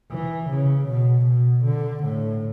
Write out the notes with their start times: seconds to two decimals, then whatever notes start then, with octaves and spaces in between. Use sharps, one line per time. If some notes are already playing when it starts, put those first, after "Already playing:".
0.11 E3
0.49 C#3
0.88 B2
1.27 B2
1.65 D3
2.04 A2